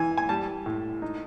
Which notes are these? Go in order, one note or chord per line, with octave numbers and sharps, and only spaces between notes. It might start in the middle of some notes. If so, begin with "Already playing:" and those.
Already playing: E3 G#5
G#5
G3 A5
A2
D#4